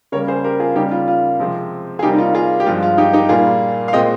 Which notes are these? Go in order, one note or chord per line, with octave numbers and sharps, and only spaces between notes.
C#3 G3 A#3 A#4 C#5
G#4 C5
G4 A#4
F4 G#4
C#3 G3 A#3 D#4 G4
F4
F4
C3 F3 G#3 C4
G#4
C3 G3 A#3 D#4 G4
D#4
F4
F4 G#4
G4
G2 F3 G#3 F4
F4
D#4 G4
D#4 G4
A#2 G3 A#3 F4 G#4
F5
A#2 G#3 C4 D#5 G5